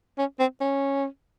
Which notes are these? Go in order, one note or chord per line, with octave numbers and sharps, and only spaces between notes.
C#4
C4
C#4